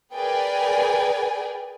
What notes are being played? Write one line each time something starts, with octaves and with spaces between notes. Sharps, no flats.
G#4 A#4 B4 D5 G5 G#5